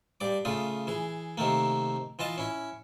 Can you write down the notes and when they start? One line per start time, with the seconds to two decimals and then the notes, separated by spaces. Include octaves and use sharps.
0.20 G2 D5 D6
0.45 C#3 A3 F4 D#6
0.87 E3 G#4
1.38 C3 D#3 A3 A#3
2.19 E3 F4 D#5 A5
2.38 C#4 E4